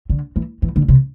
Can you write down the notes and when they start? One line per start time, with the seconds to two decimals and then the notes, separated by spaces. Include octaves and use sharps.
0.10 D3
0.36 E3
0.62 E3
0.76 D3
0.88 C3